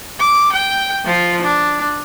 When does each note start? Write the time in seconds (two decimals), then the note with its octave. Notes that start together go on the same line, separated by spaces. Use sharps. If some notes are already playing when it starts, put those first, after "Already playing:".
0.19 D6
0.52 G5
1.05 F3 F4
1.42 D4